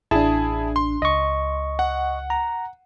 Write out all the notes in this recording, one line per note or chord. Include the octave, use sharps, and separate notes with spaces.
A1 D4 E4 G#4 A5
C6
C#2 D#5 C#6
F#5
A#5